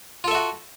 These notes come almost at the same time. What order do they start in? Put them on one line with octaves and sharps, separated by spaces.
F4 A4 E5 F#4